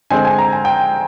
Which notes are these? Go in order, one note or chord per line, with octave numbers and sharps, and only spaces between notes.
D3 G#3 C4 G#5
G#5
A#5
G#5
G5